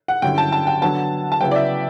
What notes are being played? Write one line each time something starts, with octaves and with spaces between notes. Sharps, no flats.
F#5
G2 D3 F#3 C#4 E4 G5
A5
A5
G5
D3 F#3 B3 D4 A5
A5
C#3 F#3 B3 E4 G5
D5
E5